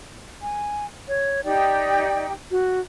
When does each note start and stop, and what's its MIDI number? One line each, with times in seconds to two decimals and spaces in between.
0.42 0.86 80
1.08 1.41 73
1.44 2.33 63
1.44 2.33 67
1.44 2.25 74
1.44 2.33 79
2.51 2.80 66